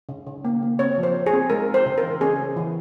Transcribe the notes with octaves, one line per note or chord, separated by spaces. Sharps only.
C#3
C#3
A#3
A#3
C4 C#5
F3
C5
F3
G#4
C4
G#3 A#4
C4
C5
C#3
A#4
E3
C#4 G#4
C#4
E3